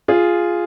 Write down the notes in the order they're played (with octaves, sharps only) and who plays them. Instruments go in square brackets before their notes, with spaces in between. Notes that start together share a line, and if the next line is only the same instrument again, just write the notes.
[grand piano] F4 G#4